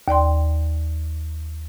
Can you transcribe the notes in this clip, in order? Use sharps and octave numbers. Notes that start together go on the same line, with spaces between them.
D#2 D5 G5 C6